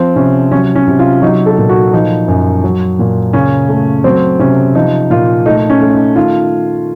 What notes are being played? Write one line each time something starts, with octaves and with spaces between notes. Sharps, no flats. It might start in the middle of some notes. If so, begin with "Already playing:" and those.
Already playing: F3 C4
C3 C#4
F#3 C#4
C#4
C3
F4
F#3 D#4
A4
A#2
F#4
F3 D#4
F#2
F#3
A#2
C#3 C#4
A3
F#3 C4
C3 C#4
F3 D#4
A#2 F4
A3 D#4
C#4
A3
D#4
D#3 F4